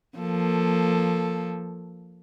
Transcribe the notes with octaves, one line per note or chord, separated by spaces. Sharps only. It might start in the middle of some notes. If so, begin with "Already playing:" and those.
F3 A#3 A4